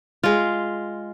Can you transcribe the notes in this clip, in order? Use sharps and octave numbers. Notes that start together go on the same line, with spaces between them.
G#3 F4